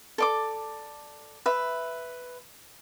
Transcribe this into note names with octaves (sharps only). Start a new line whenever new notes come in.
A4 D5 D6
B4 E5